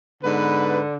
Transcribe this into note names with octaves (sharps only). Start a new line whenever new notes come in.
G#2 D3 B3 B4